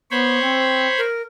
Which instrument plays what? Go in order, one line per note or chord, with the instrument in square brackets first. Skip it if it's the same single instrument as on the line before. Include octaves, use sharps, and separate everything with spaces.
[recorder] B3 [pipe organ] C5 C#5 B5
[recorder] C4
A#4